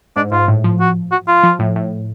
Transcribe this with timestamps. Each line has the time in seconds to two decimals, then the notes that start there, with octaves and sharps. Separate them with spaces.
0.16 G#2 D4
0.32 G#2 F4
0.48 A2
0.64 F3
0.80 F#4
1.12 F#4
1.27 F4
1.43 F3
1.59 A2
1.76 A2